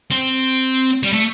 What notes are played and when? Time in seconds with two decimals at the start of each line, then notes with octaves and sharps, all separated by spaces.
0.11 C4
1.03 G3
1.13 A3